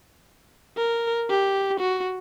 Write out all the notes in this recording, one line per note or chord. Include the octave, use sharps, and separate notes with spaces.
A#4
G4
F#4